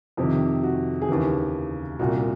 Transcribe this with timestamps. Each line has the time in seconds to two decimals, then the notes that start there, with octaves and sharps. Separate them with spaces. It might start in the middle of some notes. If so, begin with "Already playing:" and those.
0.17 F2 C3 D#3 G4
0.63 F#4
1.02 G#4
1.09 D#2 C#3 E3 G4
1.99 C2 A#2 F#4